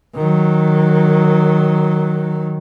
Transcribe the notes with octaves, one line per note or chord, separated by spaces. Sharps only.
D#3 F#3